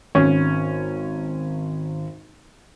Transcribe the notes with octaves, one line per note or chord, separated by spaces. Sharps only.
G#1 C#4